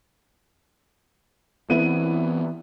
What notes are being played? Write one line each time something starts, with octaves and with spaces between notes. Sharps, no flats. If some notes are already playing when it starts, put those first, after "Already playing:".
E3 B3 C4 E4 D#7